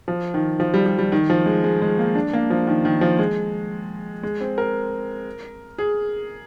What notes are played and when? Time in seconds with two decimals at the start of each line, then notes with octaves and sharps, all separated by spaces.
0.08 F3
0.34 D#3
0.60 F3
0.74 G3
0.86 G3
0.99 G3
1.12 D#3
1.30 F3
1.46 G#3
1.64 G#3
1.82 G#3
1.99 A#3
2.15 D4
2.33 A#3
2.50 F3
2.67 D#3
2.85 D#3
3.01 F3
3.19 G#3
4.23 G#3
4.41 C4
4.58 A#4
5.78 G#4